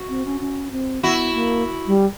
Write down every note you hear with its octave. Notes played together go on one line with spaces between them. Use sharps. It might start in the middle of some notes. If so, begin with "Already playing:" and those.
Already playing: F#4
C4
C#4
C#4
C4
B3 E4 F#4
A#3
G3